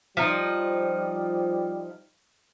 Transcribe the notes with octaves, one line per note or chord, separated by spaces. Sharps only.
F3 G3 D#4